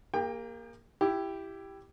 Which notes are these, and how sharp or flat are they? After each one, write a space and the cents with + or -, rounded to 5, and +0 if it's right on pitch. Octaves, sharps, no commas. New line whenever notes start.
A#3 +0 G#4 -40 G5 +25
E4 +15 G4 +0